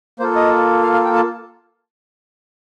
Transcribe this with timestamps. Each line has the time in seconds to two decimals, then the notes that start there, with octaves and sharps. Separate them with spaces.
0.20 A#3 F4 A4 C5
0.36 D#5
0.83 F5
0.93 F5
1.04 G5
1.15 A5